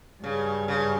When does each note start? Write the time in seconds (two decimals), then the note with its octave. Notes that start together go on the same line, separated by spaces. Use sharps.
0.23 G2 C#3
0.68 C#3